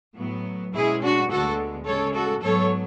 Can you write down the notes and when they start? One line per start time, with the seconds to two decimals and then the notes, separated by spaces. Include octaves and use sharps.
0.17 A2 F#3 B3
0.73 B2 G#3 C#4 E4 G#4
1.02 D4 F#4
1.30 D2 D3 G#3 B3 F#4 A4
1.86 C#3 G#3 C#4 A4 C#5
2.14 F#4 A4
2.42 G#2 F#3 B3 A4 C#5